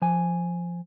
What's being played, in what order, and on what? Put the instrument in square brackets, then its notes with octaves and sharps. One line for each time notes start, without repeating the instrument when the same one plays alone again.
[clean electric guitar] F3 G#5